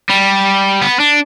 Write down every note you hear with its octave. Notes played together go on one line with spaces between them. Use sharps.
G3
B3
D4